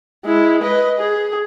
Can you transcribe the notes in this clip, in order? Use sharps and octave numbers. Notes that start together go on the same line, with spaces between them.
G#3 E4
B4 D#5
G#4